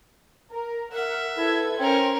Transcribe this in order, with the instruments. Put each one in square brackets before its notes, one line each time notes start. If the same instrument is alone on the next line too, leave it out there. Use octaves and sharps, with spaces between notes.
[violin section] A#4
[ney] A#4 [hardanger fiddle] E5 [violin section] F#5
[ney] E4 [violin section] A4 B4 G#6
[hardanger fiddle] C#4 A#4 [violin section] C5 [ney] G5